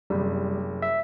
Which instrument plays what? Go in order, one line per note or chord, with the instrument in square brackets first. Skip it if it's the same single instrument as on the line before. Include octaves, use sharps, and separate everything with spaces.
[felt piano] F#1 C3 [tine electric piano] G3
[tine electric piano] E5